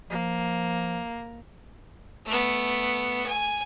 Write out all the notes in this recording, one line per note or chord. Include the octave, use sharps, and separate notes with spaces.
F3 A#3
A3 B3
G#5